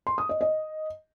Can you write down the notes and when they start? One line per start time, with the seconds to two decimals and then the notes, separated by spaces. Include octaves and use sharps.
0.07 C6
0.18 D#6
0.29 D#5
0.41 D#5